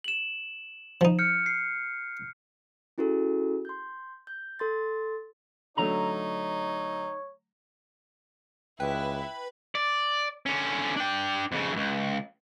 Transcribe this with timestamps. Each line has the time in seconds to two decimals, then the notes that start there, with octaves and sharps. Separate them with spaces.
0.04 E7 F#7
1.01 F3 D#4
1.19 F6 G6 C#7
1.46 C7
2.98 C#4 E4 F#4 G#4 A4
3.65 C6 G6
4.27 G6
4.59 A4 C6 A6
5.77 D3 F#3 A3 D#4 C#5 A#5
8.80 C#2 E4 B4 G5
9.75 D5
10.46 D3 C#4
10.97 D4 G5
11.52 F2 C#3
11.72 C#2 F#2